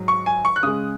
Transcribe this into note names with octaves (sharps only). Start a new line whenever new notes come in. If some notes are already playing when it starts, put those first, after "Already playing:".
Already playing: G#2 F#3
C#6
G#5
C#6
F#6
C#3 G#3 D#6